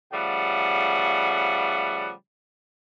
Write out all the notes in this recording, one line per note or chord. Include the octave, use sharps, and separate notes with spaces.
C#3 F3 G3 A3 F#5